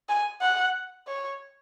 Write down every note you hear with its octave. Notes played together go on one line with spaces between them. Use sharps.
G#5
F#5
C#5